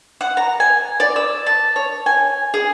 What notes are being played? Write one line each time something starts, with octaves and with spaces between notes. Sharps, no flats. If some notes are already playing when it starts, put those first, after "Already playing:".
F#5
A#5
G#5
D5
E6
A5
C#5
G#5
G#4